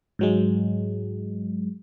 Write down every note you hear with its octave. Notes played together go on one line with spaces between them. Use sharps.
G#2 F#3 G#3